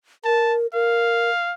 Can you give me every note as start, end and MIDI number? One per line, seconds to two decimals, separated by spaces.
0.25 0.67 70
0.25 0.55 81
0.74 1.30 70
0.74 1.54 77